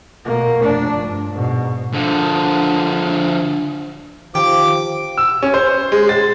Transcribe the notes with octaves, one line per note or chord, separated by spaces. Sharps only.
B2 A#3
F1 D4
G2
G#2 B2
D3 F3
D#3 F3 G4 D6
E6
C#4
C5
G#3
A6